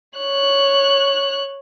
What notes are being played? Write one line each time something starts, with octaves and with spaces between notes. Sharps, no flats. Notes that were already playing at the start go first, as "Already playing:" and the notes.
C#5 F#6